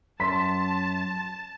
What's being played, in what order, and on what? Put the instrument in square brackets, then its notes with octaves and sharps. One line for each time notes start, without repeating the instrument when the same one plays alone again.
[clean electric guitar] F#2 [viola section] A5 [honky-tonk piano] C6 B6